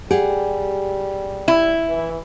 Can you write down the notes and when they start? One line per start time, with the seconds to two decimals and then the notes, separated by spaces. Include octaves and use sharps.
0.11 G3 G4 G#4 F#5
1.48 E4
1.88 E3